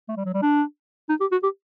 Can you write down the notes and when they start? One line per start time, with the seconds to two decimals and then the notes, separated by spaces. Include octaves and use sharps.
0.08 A3
0.17 G3
0.25 F#3
0.34 G3
0.42 D4
1.09 D#4
1.21 G4
1.32 F#4
1.43 G4